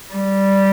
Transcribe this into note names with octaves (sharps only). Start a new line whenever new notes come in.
G3